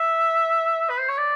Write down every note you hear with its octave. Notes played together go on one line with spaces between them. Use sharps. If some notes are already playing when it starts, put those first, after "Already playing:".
Already playing: E5
B4
C5
C#5
D5